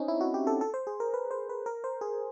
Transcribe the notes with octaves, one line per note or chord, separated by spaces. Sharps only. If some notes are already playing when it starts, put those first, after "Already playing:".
Already playing: C4 C#4 D#4
E4
F#4
G4
A4
A4
C5
G#4
A#4
B4
C5
B4
A#4
C5
G#4